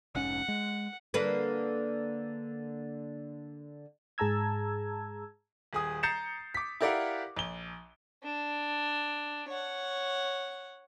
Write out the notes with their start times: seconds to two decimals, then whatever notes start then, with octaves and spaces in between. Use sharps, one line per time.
0.15 F1 G#2 C#4 F#5
0.48 G#3
1.14 D3 A#3 B4
4.18 G#2 G#4 A5 A#5 E6 G#6
5.73 D#1 G#4 D#6
6.03 A#5 G6 A6 C7 C#7 E7
6.55 D6 B6
6.81 E4 G4 A#4 D5 F5 F#5
7.37 A#1 G7
8.23 D4
9.49 C#5 F#5